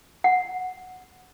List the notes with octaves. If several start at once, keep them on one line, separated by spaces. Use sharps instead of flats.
F#5